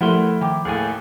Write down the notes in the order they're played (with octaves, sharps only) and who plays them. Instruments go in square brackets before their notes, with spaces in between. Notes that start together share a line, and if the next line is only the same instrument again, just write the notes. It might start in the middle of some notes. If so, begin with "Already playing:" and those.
[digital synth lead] F3 [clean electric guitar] G3 A#4 C6 [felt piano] A3 F#5 [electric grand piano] E4
[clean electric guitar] D#3 [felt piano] G5 D6
[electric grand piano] D#2 A2 [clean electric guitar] G#4 A4 G#5